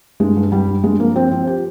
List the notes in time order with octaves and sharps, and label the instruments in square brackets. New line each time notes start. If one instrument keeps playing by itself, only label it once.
[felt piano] G2 G#3
G2
G2 G3
G2
G2 G#3
F3 A#3
F3 C4
F3 C4
G4